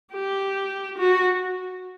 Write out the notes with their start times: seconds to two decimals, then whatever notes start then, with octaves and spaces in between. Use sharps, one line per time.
0.13 G4
0.98 F#4